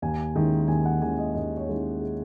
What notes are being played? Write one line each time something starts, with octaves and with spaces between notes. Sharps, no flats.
D#2 G#5
D#3 G#3 C#4 E4
D#2 G#5
F#5
D#3 G#3 C#4 E4 G#5
D#5
D#2 D#5
C#5
D#3 G#3 C#4 E4
G#4